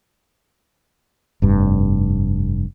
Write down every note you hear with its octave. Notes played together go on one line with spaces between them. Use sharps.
F1 G2